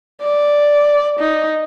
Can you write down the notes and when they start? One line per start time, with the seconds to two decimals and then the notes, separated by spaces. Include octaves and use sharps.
0.22 D5
1.19 D#4